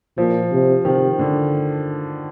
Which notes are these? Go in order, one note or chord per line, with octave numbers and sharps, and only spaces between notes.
A#2 F3
C3
C3 D#3
D3